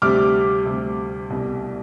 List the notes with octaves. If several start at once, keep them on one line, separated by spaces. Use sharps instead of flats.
D2 C3 G3 D6 F6
D2 C3 G3
C2 B2 G3